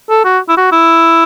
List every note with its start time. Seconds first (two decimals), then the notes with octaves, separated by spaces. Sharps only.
0.10 A4
0.25 F#4
0.49 E4
0.57 F#4
0.72 E4